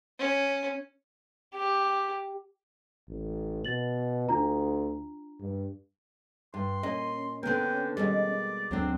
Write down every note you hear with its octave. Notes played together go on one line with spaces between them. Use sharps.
C#4
G4
A1
B2 A6 F#7
D2 D4 F4 A#5
G2
G2 C6
A#2 C#4 D#5
D3 B3 C4 A#4 G5
B2 D#3 G3 G#3 D5
D2 F#3 C4 D4